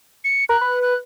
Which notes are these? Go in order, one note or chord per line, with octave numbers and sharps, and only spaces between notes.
C#7
A#4 F#6
B4
F#6